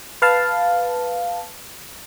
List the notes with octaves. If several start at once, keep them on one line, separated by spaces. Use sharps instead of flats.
B4 F5 A5